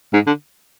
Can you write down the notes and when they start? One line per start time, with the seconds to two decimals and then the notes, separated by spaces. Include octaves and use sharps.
0.13 G#2
0.27 D3